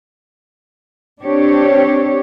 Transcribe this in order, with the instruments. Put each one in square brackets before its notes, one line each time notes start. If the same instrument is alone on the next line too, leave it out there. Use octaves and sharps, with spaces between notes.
[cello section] C4 D4 G4 C#5